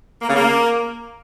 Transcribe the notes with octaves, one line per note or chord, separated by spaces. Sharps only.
A#3
C#3
A#3